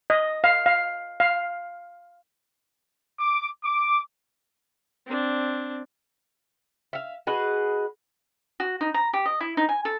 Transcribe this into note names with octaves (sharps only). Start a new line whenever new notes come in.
D#5
F5
F5
F5
D6
D6
C4 D4
E5 F5
F#4 G#4 B4 D#5
F#4
D#4
A#5
G4
D#5
E4
D#4
G#5
A4